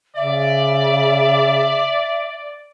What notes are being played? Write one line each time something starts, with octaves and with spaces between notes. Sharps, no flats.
C#3 D5 E5